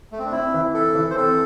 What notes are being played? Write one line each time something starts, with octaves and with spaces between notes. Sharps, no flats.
A3
C4
D4
C4 E4
E3
E4 A4
E3
C5
C4 A4